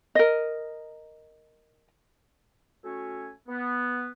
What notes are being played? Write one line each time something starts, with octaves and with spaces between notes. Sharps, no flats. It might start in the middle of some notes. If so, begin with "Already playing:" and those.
A#4 D#5
A3 C#4 F#4 C#5 E5 G#5
B3